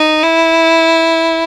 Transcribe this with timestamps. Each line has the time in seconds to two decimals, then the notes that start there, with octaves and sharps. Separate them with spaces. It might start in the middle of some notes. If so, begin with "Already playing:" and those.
Already playing: D#4
0.24 E4